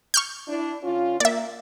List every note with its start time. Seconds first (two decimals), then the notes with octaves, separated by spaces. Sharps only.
0.14 C#6 F6 G6
0.48 D4 E4
0.83 D3 C#4 F4
1.20 A#3 D5 E5